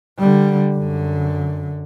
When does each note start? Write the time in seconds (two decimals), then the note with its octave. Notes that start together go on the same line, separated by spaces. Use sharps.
0.19 D3 G3
0.75 F#2 D3